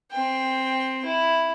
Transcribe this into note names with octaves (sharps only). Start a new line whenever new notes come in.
C4 G5
E4